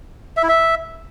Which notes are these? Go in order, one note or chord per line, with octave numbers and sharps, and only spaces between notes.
E5
E4
E5